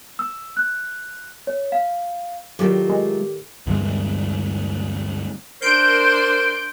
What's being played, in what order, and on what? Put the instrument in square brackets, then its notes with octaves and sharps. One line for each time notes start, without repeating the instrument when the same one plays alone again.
[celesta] E6
F#6
C#5
F5
[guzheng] A2 D#3 D5 [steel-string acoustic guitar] F#3 A3 F4 [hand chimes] G4 D6
[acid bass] G#3
[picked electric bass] D2 G2 E3 G#3
[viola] D4 C6 [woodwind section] A#4 C5 [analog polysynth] G6 D7